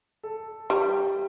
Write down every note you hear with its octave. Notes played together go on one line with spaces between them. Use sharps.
A4
G3 G4